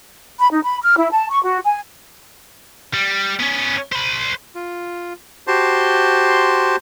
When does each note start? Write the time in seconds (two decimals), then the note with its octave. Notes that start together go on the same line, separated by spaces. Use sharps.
0.40 B5
0.51 D#4
0.64 B5
0.82 F6
0.97 E4
1.12 A5
1.30 C#6
1.44 F#4
1.65 G#5
2.94 G3
3.39 B3 C#4
3.92 C5 B5
4.55 F4
5.47 F#4 G4 C5 A5 C6